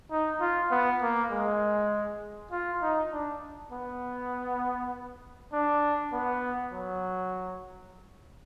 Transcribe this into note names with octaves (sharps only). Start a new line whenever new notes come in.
D#4
F4
B3
A#3
G#3
F4
D#4
D4
B3
D4
B3
F#3